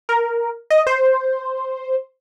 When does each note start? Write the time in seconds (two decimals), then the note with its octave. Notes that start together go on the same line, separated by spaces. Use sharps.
0.09 A#4
0.70 D#5
0.87 C5